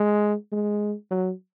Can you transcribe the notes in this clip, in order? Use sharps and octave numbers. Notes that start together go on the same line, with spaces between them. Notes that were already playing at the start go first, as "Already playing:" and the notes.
Already playing: G#3
G#3
F#3